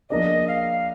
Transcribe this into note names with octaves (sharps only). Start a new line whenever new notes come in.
F3 A#3 D4 G#4 D5 D#5
F5